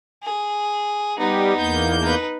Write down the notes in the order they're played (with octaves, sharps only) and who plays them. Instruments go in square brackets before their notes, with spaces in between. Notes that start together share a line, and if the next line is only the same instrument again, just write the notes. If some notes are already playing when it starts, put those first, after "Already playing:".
[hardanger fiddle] G#4
[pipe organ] G3 G4 [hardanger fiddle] B3 D#4
[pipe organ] E2 A#3 G6
[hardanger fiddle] D#4 B4